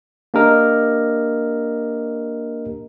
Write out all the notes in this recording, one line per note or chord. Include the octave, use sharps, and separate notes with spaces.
A#3 D4 G4 A#4 D#5